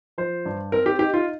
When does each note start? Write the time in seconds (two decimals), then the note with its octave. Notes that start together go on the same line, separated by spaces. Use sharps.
0.18 F3 C5
0.45 G2
0.72 C4 A#4
0.86 G4
0.99 D#4 G4
1.14 F4